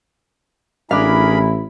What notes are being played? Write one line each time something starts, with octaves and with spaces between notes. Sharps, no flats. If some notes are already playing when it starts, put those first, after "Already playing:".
A1 D4 E4 G#4 A#4 F5 B5